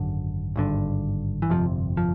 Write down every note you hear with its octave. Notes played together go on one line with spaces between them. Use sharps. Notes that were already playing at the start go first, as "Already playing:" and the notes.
Already playing: G#1 F#2 D3
G#1 G2 D3
E3
G1 F2 C3 F3
F3